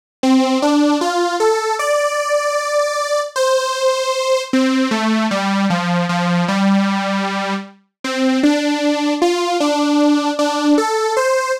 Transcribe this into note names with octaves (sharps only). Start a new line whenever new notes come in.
C4
D4
F4
A4
D5
C5
C4
A3
G3
F3
F3
G3
C4
D4
F4
D4
D4
A4
C5